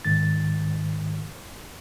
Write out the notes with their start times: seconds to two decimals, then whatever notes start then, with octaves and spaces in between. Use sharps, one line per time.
0.05 G#2 D#3 A6